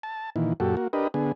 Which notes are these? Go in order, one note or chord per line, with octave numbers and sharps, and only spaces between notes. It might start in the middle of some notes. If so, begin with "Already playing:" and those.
A5
A#2 D#3 E3
F#2 A#2 F#4 G4 A4
A#3 F#4
D4 G4 A#4 B4 D#5
D3 B3 G#4